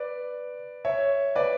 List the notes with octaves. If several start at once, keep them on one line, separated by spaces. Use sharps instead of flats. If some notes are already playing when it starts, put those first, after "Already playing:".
Already playing: B4 D5
C#5 E5
B4 D5